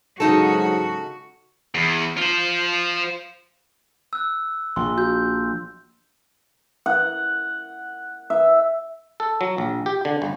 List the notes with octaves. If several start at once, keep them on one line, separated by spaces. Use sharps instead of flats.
G#2 C#3 F#3 D#4 F#4 A4
E2
F4 C5
E6 F#6
A#1 C6
F#4 G6
F#5
E5
A4
F#3
A#1
G4
D3
G1